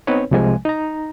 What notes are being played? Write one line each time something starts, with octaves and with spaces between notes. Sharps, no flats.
B3 C4 D#4 B4 C#5
C2 C3 F3 G#3 G#5
D#4 A#5